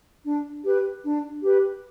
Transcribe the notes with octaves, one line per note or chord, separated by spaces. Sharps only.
D4
G4 B4
D4
G4 B4